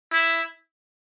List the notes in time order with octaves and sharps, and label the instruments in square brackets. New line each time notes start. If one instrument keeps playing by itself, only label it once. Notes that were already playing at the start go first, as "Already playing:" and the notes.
[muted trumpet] E4